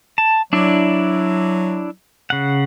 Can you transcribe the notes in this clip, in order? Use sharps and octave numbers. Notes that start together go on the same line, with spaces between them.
A5
F#3 D4 E4 D5
C#3 F#5